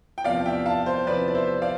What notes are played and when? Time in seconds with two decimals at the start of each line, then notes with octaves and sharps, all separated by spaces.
0.18 G5
0.24 E2 C3 F3 D5 F5
0.46 E5 G5
0.66 F5 A5
0.86 C5
1.07 E2 C3 F3 B4 D5
1.28 D5
1.35 C5 E5
1.62 D5 F5